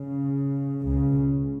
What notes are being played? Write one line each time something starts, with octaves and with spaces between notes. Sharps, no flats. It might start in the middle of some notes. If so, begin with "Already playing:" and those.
Already playing: C#3
C#2 C#3